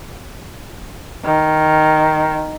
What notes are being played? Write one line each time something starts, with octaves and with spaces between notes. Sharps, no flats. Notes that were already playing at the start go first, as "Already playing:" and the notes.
D#3